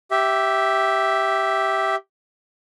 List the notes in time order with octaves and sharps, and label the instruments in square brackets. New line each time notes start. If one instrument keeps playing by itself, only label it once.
[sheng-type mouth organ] G4 E5